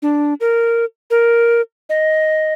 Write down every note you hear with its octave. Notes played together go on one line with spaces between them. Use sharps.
D4
A#4
A#4
D#5